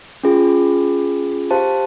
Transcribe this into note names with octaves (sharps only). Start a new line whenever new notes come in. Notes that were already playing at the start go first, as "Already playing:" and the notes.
C#4 F4 G#4
G4 C5 F5 A5